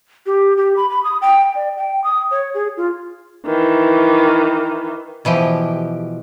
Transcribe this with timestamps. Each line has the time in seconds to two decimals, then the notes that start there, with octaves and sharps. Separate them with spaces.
0.26 G4
0.57 G4
0.77 B5
0.90 B5
1.04 D#6
1.21 G5
1.55 D5
1.77 G5
2.04 D#6
2.31 C#5
2.54 G#4
2.77 F4
3.46 D#3 E3
5.25 B2 E3 F3 G4